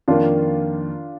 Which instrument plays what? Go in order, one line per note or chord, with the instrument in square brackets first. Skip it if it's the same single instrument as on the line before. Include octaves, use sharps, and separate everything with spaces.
[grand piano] F2 D#3 A#3 [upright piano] D4 F4